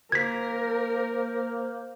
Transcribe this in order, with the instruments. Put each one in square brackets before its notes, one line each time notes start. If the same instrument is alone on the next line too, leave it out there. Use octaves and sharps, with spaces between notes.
[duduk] A#3 [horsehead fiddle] A#4 [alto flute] C5 [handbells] G#6 B6